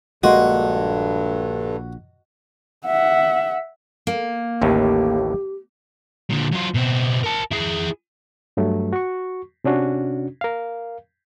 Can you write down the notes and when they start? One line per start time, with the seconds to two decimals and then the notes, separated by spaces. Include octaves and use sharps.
0.23 A#1 G2 D3 G#3 A#3 F#4 D#5 C6
2.86 E5 F#5
4.07 A#3
4.62 A1 D#2 A2 G4
6.30 A#2 D3
6.52 F#3 F4
6.74 B2 C4
7.23 A#4 A5
7.51 E4 G#4
8.57 G2 F#3 A3
8.93 F#4 C#6
9.64 C3 C#4 D4 F#4
10.41 A#4 F5